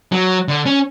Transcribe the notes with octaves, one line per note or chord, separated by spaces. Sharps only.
F#3
D3
C#4